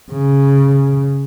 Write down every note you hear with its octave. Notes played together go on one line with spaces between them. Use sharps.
C#3